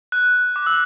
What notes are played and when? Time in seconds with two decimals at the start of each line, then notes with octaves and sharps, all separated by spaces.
0.12 F#6
0.56 D6
0.66 E6